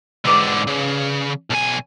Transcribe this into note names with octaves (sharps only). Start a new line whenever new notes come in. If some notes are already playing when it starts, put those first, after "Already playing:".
G#2 D3 B4 D5 B5
C#3
B1 G#5